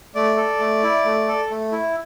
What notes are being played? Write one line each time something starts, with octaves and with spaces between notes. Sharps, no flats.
A3 D5
A4
A3
E4
A3
A4
A3
E4